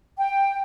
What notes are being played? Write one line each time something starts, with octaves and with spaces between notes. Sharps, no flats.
G5